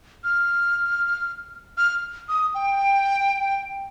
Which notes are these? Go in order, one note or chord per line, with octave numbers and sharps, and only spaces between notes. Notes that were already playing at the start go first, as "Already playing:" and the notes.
F6
F6
D#6
G5